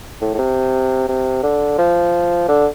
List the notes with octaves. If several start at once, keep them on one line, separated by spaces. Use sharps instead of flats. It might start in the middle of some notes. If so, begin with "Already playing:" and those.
A2
A2
C3
C3
D3
F3
D3